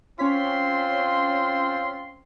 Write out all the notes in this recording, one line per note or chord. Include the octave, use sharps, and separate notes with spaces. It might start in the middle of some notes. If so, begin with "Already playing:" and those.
C4 C#4 F4 C#5 C6 B6